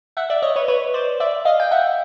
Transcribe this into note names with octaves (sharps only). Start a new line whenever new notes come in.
E5 F#5
D5 E5
C#5 D#5
B4 C#5
B4 C#5
C5 D5
D5 E5
D#5 F5
G5
E5 F#5